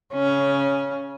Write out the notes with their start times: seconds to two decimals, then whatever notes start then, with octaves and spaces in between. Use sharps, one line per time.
0.14 C#3 C#4